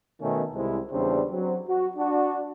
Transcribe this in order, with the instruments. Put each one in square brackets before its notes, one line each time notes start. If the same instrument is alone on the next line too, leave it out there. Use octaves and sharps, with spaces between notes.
[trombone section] B2 D#3 A3 C#4
C2 C3 G#3 C4 E4
E2 C#3 G3 C4 D4
F#3 C4
F#4
D4 F#4